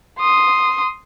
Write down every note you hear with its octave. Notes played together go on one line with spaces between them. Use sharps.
C6 D#6